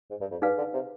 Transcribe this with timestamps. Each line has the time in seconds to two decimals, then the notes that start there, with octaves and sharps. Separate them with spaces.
0.10 G#2
0.21 G2
0.31 F2
0.42 G2 D#4 G#4 B4 F5
0.58 D3
0.74 C3